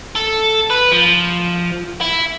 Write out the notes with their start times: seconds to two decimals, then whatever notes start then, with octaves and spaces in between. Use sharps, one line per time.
0.16 A4
0.71 B4
0.92 F3
2.01 E4